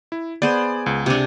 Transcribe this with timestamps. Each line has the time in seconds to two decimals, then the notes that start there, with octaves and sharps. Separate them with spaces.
0.12 E4
0.42 B3 G#4 C5 D5
0.86 C#2
1.06 C3 D4